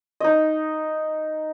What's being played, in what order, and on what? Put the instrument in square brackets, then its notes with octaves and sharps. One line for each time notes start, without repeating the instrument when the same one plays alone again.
[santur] D#4 D#5